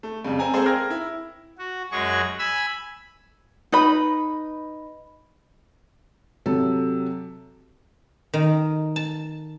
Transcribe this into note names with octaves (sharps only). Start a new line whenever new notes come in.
A3
F2 C#3 G3
C4 G#5 A#5
G#3 A#3 C4 G#4 A4 C5
A#4 G5 F6 G#6 A#6
E4
F#4
F#2 F#3 G#3 G#4 C#6
G#5 B5 E6
D#4 B4 D#5 B5
C3 F#3 A4
D#3
A5